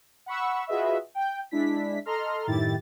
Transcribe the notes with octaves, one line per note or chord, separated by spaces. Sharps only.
F#5 B5 C#6 E6
F4 F#4 G#4 B4 D#5 E5
G5 G6
G#3 D4 E4 B6
A4 D#5 A#5 C6 F6
F#2 A2 D#3 E4 G4 A6